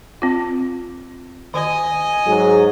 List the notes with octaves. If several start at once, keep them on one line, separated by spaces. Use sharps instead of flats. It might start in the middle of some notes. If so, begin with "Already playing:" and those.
C4 F4
D#3 D#5 G#5
G#2 F#3 G#4